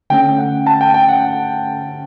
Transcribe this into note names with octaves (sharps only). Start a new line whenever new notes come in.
D3 A3 C#4 G5
F#5
A5
G5
G5
F#5